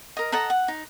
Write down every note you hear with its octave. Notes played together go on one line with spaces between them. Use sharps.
A#4 D#5
A4 D#5 F#5 A#5
F#5
D#4